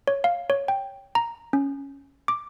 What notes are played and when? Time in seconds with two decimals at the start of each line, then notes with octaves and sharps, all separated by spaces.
0.08 C#5
0.24 F5
0.50 C#5
0.68 G5
1.15 A#5
1.53 C#4
2.28 D6